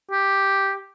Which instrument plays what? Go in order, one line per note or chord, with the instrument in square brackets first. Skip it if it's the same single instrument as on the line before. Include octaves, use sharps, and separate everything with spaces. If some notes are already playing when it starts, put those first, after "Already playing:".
[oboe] G4